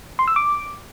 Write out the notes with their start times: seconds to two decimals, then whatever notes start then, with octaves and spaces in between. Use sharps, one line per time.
0.19 C6
0.28 E6
0.36 D6